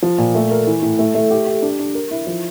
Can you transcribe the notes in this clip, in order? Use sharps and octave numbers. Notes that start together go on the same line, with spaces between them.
F3
A#2
A3
A#4
E3
A2
A3
A3
G4
G4
D4
D4
A#4
E4
F3